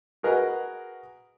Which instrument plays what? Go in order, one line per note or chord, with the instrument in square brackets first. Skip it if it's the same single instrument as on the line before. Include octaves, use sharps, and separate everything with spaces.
[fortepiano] F#4 G#4 A#4 B4 D#5 F#5